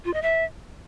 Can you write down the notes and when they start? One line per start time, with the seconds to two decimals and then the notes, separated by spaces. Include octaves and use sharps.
0.05 F4
0.14 D#5
0.22 E5